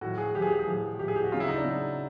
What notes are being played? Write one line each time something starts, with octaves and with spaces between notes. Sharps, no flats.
A2 F3 F#4
G#4
A2 F3 G4
G#4
G4
G#4
A2 F3
A2 F3 G4
G#4
G4
F#4
C#3 F#3 F4
E4
D#4
D4
C#3 F#3